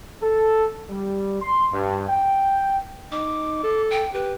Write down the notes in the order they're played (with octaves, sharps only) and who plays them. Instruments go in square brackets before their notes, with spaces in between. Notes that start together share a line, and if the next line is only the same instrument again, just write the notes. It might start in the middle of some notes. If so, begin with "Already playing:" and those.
[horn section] A4
G3
C6
G2
G5
[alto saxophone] D#4 [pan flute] D6
[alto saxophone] A4
[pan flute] G5
[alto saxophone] G4 [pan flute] B4